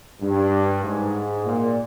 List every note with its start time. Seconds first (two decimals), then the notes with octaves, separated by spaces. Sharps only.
0.21 G2
0.83 G#2
1.45 A#2